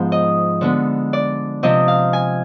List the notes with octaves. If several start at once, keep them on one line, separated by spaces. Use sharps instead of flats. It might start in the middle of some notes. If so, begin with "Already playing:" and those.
Already playing: G#2 F3 B3
D#5
D3 G#3 B3
D5
C3 F3 C4 D#5
F5
G#5